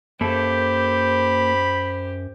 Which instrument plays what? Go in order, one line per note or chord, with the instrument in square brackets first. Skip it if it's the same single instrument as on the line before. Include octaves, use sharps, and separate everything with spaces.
[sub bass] F#2 [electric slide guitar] A#3 A4 [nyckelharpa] G4 C5 [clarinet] B5